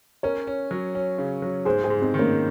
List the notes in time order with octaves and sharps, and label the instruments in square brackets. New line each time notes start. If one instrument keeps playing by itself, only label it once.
[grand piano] C#4 [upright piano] A#4 C#5
[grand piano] C#4
F#3
C#4
C#3
F#3
[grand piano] G#2 [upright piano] G#4 C5
[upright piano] G#4 C5
[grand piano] G#2
[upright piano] C4 D#4
[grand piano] D#3
[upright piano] A#3 C#4